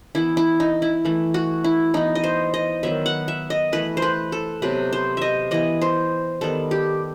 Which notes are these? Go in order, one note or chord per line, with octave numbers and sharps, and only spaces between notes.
E3 B3 E4
E4
D#4
E4
E3 A3
F#4
E4
E3 B3 D#4
D#5
C5
D#5
D#3 F#3 B3 E5
F#5
E5
D#5
E3 A3 B4
C5
B4
A4
C3 F#3 B3 B4
C5
D#5 E5
E3 B3 D#5
C5
D#3 G3 B3 A4
G4